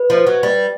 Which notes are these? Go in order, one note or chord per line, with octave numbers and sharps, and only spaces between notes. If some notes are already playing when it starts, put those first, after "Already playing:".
Already playing: B4
F3
F#3
G3